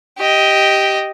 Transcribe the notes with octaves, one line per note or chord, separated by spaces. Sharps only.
G4 D#5